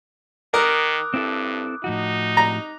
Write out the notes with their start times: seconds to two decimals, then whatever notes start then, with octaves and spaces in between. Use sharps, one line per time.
0.54 D#3 A#4 D6 D#6 F#6
1.14 G2 C4 E4 A4
1.84 A2 F3 D#4 F#4
2.37 A#5